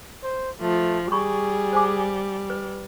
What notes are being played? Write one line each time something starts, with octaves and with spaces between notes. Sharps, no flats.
C5
F3 A3
G3 G#4 B5 C#6
C5 G#5 D6
B4